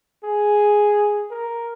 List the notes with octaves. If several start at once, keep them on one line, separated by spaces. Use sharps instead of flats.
G#4
A#4